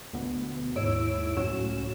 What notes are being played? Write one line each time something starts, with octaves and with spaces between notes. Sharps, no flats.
D2 B2 B3
D#2 G#2 E4 C#5 E6 D7
C#2 F#2 A2 C#4 F#4 E7